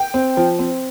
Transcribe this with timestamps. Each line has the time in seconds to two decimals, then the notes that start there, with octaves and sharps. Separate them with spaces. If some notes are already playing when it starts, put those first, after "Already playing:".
Already playing: G5
0.14 C4
0.37 F3
0.59 C4